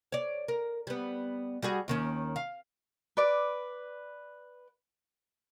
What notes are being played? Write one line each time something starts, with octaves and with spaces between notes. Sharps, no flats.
C#5 D5
A#4
G3 B3
G3 F#4 G#4
D#2 D#3 C#4
F5
B4 D5 D6